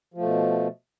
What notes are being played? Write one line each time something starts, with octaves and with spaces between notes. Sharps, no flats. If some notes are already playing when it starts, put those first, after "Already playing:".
B2 F3 A3